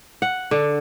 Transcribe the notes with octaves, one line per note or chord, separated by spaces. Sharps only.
F#5
D3